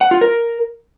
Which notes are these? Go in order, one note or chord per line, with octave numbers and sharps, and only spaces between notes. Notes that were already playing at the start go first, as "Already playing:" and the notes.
F#5
F4
A#4